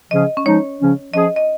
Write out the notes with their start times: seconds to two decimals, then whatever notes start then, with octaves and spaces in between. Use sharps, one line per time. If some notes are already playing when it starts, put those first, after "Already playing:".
0.11 C#3 F3 C#4 G#4 D#5
0.37 C#4
0.45 F3 G#3 D#4 C#5
0.80 C#3 F3 C#4
1.14 F3 C#4 G#4 D#5
1.36 D#5